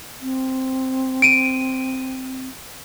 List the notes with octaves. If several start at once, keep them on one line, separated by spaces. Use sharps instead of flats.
C4
D7 D#7